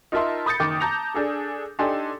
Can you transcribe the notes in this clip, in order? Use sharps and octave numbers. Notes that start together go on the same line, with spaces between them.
D#4 F4 A#4 E5 A5 C6
B5 D#6 G6 A6 C#7
F#1 D#3 D6
A5 A#5 G6 A#6 F7
D4 G#4 A4
D4 D#4 G4 A4 G#5 C6